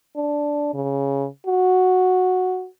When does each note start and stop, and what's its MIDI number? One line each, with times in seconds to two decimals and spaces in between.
0.16 0.70 62
0.74 1.27 49
1.47 2.67 66